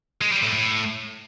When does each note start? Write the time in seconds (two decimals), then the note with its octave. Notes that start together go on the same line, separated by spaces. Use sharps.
0.21 G#3
0.32 G3
0.43 A2
0.53 A2